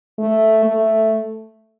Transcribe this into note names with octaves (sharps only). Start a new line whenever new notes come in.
A3
A3